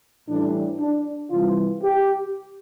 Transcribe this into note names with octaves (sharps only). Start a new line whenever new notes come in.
A2 E3 G3 D4
D4
C3 E3 G3 F4
G4